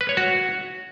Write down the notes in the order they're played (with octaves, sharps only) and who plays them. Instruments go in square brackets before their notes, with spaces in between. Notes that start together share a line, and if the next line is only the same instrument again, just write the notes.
[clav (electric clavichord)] B4
C#5
F#4